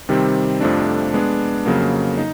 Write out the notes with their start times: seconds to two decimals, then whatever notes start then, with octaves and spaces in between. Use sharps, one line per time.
0.09 C3 D#3 G3 C4
0.61 F2 C3 F3 A3 D4
1.14 G#3 B3 D4
1.66 F2 C#3 F#3 A#3
2.17 D#4